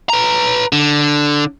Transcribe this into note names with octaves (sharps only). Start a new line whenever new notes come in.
B4 A#5
D3